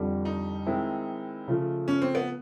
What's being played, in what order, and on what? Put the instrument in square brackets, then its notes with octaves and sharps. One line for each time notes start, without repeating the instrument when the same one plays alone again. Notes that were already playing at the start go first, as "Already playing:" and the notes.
Already playing: [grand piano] F2 D3 G3
[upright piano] D#4
[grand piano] D#3 G#3 C4 E4
C#3 F3 A3
[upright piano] C#4
C4
B3